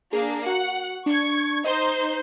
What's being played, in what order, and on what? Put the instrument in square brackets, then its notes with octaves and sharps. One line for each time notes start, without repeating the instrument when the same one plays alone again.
[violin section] A#3 D4 [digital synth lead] G#4
[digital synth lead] F#4 [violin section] F#5
[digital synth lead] D4 [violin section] C#6 G#6
[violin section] D#4 C5 G6 [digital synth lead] D#5